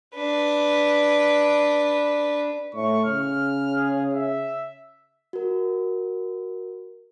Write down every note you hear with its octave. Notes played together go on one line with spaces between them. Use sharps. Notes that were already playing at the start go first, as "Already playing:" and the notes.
D4 B4
A2 C#6
C#3 F6
G#4
E5
F#4 A#4